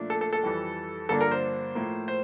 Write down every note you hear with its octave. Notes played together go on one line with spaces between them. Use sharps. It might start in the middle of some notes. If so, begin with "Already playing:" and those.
Already playing: A#2 F3 A3 D4
A4
A4
A4
F2 E3 G3
G2 D3 F3 A#3 D4 A4
A#4
C5
A2 F3 A#3
C5